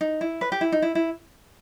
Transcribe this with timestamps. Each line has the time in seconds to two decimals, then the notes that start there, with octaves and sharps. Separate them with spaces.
0.01 D#4
0.21 E4
0.41 B4
0.52 G4
0.61 E4
0.72 D#4
0.82 E4
0.95 E4